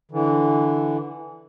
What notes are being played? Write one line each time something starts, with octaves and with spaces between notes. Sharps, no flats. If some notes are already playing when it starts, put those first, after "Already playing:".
D3 E3